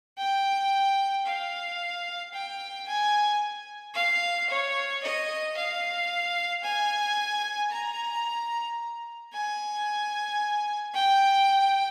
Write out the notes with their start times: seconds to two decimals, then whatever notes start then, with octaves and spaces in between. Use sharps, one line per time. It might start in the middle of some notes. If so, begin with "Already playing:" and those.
0.18 G5
1.26 F5
2.33 G5
2.87 G#5
3.94 F5
4.49 C#5
5.03 D#5
5.56 F5
6.63 G#5
7.71 A#5
9.33 G#5
10.94 G5